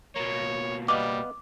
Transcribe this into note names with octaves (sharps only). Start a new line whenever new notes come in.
B2 A#3 C#5
G3 B3 D#5 F5 D6